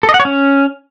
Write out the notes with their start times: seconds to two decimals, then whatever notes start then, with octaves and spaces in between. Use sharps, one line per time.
0.03 A4
0.09 D#5
0.14 F#5
0.20 C#5
0.25 C#4